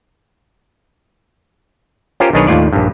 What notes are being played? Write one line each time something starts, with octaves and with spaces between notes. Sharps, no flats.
C#4 F4 G4 A#4 C5
B1 D#3 D4 G#4 B4 C#5
D#2 A2 F4 D5
A#1 G2